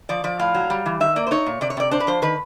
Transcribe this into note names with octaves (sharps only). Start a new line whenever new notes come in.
F3 D5
F3 D5
A2 F5
F#3
G3
E3
D#3 E5
A#3 D5
C5
D#4 C#5
A#2
C3 D5
C#5
C3 D5
D4 C5
B4
F3 C5
D#3 B4